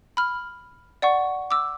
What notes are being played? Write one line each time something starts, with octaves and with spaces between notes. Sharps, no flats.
B5 F6
D5 F#5 C#6
D6 E6